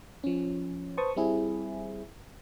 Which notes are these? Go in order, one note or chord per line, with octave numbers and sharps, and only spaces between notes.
F3 C#4
B4 C5 A5 C#6 D#6
G3 C4 E4 G#4